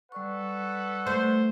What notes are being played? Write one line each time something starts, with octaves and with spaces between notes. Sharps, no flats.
G3 A4 B4 D5 F#5 C#6
A3 C5